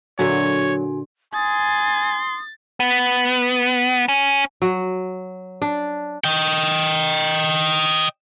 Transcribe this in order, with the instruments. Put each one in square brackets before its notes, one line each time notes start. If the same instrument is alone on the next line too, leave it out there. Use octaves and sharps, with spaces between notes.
[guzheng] A#2 D3 E5 [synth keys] F#3 [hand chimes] F#4 G#5 [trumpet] C#5
[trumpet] G#5 [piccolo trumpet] C6 [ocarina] D#6 [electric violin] A6
[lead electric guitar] B3
C#4
[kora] F#3
D4
[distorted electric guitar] D#5 G5